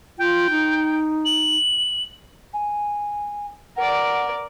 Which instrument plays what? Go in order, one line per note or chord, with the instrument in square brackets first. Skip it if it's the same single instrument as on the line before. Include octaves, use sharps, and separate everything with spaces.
[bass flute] F4 [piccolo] G5
[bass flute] D#4
[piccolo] F#7
[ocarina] G#5
[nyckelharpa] A#4 D5 [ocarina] F#5